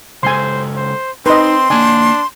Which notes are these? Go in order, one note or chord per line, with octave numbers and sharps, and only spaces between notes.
C#3 G#3 A4 C5 G#5 C6
C5
C4 D#4 B4 D#5 C6
D3 A#3 D4 G#5